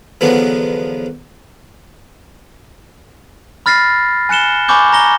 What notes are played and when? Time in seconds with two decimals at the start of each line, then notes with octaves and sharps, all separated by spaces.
0.21 E2 D3 F3 F#3 B3
3.66 B5 F6 A6 A#6 C7
4.29 G#5 F#6 C#7 E7 G7
4.68 G#5 B5 C#6 D6 G6 G7
4.92 A#5 A#6 G7